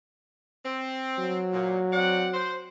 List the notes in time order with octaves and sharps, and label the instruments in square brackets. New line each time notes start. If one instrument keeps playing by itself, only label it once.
[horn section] C4
[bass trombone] F#3
[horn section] A#2
C4 D5 F#5
C5